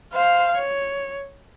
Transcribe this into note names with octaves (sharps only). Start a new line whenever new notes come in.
C5 F5
C#5